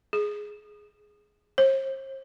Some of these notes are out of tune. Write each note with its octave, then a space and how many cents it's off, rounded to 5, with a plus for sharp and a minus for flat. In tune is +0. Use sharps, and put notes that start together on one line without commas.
G#4 +5
C5 +40